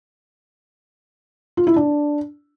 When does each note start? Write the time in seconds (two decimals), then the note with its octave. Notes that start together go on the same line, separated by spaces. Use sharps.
1.57 F4
1.67 E4
1.76 D4